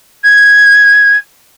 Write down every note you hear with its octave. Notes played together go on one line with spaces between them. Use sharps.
G#6